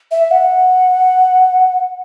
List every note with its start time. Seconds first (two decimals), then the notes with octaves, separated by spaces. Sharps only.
0.11 E5
0.31 F#5